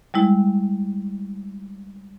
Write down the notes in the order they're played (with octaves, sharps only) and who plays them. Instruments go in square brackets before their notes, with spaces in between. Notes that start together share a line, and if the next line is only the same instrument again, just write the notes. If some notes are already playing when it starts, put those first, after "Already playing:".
[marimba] G3 G#3 E4